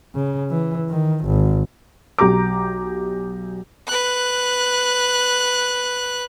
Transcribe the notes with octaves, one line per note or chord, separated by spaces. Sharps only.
C#3
E3
D#3
G#1
B1 G4 A#5 D6
B4 F#6